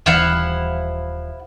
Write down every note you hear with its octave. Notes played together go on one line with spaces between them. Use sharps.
D#1 E3 F3 G3 E4 F5 F#5